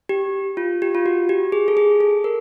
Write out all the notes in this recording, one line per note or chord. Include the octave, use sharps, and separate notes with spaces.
G4
F4
G4
F4
F#4
G4
G#4
A4
G#4
A4
A#4